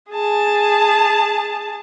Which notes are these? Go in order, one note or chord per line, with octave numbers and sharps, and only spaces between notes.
G#4 A5